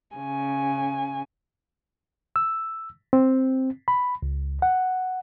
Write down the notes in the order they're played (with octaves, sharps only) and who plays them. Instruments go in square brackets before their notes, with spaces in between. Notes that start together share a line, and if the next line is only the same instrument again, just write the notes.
[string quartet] C#3 G#5
[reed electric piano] E6
C4
B5
C#2
F#5